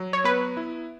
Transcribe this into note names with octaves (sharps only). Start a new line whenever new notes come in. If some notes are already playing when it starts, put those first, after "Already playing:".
Already playing: F#3
C#5
B3 B4
E4